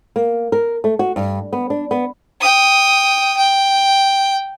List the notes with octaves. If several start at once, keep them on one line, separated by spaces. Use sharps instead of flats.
A#3
A#4
A3
F#4
G2
B3
D4
B3
G5 D#6
G5